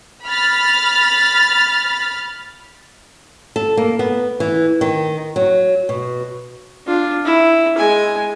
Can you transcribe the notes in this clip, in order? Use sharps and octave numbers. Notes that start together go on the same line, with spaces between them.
B5 F6 A6
A4
A#3
B3
E3
D#3
F#3
B2
D4 F4
E4
G#3 G#5